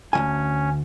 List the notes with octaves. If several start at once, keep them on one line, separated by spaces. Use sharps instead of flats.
D2 E3 C#4 G#5